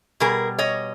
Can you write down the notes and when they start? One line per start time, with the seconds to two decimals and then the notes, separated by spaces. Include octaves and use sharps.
0.20 B2 G3 G#4 A#4
0.58 C#5 D#5